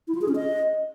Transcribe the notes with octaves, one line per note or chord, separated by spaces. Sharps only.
E4
F4
G#4
C#4
D#5